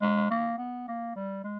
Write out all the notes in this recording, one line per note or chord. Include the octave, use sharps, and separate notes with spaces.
G#3
A#3
B3
A#3
G3
G#3